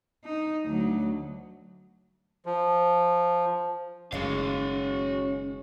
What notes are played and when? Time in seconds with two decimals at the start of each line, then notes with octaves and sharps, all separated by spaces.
0.25 D#4
0.66 D2 F#3
2.46 F3
4.12 F#1 D#2 G#3 C#4 F#4 F5